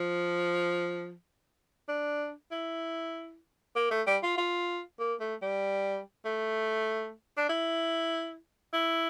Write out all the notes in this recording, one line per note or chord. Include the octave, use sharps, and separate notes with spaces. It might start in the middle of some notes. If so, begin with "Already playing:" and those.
Already playing: F3
D4
E4
A#3
A3
G3
F4
F4
A#3
A3
G3
A3
D4
E4
E4